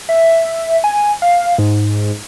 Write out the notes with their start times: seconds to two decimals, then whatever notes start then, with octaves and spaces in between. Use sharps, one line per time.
0.09 E5
0.84 G#5
1.22 F5
1.58 G#2